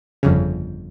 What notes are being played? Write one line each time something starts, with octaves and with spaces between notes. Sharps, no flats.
G1 F2 C#3